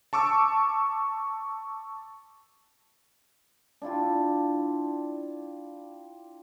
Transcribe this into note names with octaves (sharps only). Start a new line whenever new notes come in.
A5 C#6 D6 E6
D4 E4 F4 G4